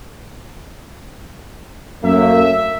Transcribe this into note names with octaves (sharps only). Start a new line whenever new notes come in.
F#2 A3 A#3 E5